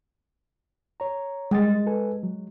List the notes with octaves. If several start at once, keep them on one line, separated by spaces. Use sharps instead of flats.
C#5 A#5
G3 G#3 D#6 A6
A4 B4 G#5
F#3